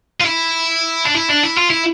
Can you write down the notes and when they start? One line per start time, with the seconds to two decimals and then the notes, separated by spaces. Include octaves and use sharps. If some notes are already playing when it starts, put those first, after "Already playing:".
0.21 F4
0.26 E4
1.05 D4
1.14 E4
1.29 D4
1.43 E4
1.57 F4
1.70 E4